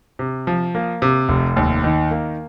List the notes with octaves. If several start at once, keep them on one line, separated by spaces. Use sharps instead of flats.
C3
F3
A#3
C3
F1
D#2
D#3
A#3